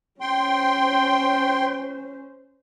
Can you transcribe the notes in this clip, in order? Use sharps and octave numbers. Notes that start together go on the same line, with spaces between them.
C#4 C5 G5 C6